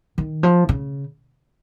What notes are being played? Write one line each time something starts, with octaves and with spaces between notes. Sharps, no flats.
D#3
F3
C#3